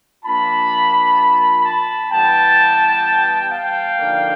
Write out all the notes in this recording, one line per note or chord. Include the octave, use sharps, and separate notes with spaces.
F3 A#3 D4 F4 A5 B5
A5 B5
E3 G3 B3 G5 A5
F5 G5
D3 F3 A#3 D#4